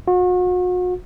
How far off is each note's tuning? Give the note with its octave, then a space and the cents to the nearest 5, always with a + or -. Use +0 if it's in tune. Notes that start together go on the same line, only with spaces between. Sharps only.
F#4 -40